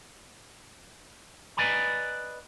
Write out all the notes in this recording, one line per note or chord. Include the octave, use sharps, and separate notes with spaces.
B4 D5 D#5 G#5 A#5 B5